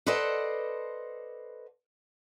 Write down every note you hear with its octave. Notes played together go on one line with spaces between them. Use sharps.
A4 B4 C5 D5 D#5 F#5